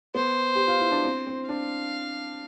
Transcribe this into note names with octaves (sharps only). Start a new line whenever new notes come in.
B3 C5
G4
F4
E4
D4
C4
C4
D4 F5